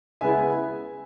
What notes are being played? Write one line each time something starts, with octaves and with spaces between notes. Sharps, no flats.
C#3 G#3 B3 E4 E5 G#5